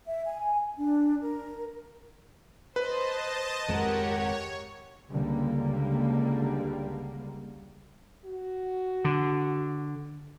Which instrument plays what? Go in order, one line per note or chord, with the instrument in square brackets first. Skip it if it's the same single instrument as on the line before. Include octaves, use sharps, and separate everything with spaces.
[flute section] E5
G#5
D4
A#4
[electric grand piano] B4 [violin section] C5 [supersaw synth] D#5 A5
[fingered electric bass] G#1 F2 G#3 [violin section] G4 A#4 F#5 [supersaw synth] C#5
[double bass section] C#2 D3 G3 A#3
[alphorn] F#4
[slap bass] D3